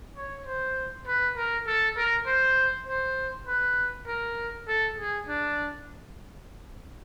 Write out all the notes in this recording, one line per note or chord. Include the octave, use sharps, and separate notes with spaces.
C#5
C5
B4
A#4
A4
A#4
C5
C5
B4
A#4
A4
G#4
D4